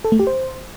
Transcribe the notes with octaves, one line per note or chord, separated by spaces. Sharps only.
A4
A3
G4
C5